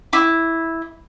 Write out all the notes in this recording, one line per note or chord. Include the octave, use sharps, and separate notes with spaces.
E4 D6